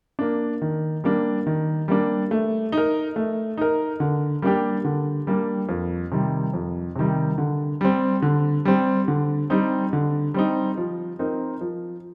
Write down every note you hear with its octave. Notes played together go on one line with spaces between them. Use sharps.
A#3 D4
D#3
G3 A#3 D4
D#3
G3 A#3 D4
A3
D#4
A#4
A3
D#4 A#4
D3
G3 A#3 D4 G4
D3
G3 A#3 D4 G4
F2
C3 D#3 G3
F2
C3 D#3 G3
D3
G3 C4
D3
G3 C4
D3
G3 C4 D#4
D3
G3 C4 D#4
F3
C4 D#4 A#4
F3